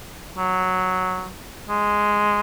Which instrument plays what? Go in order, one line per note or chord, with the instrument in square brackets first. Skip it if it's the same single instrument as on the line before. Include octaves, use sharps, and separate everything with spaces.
[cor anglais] F#3
G#3